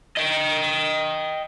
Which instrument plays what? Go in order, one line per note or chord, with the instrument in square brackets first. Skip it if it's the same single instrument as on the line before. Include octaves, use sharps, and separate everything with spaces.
[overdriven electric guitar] D#5 G5